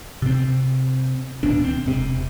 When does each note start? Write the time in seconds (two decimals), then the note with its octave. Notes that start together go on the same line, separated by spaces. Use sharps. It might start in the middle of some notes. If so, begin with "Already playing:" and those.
0.22 C3 C4
1.43 D1 D#2 B2 D4
1.65 C4
1.86 E1 C3